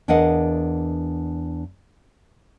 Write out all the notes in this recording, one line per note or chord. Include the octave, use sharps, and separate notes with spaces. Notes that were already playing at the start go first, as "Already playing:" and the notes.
E2 D4 A#4 D#5 F5 F#5